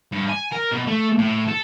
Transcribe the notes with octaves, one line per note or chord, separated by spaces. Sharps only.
G2
G#5
A#4
B2
A3
A2
A4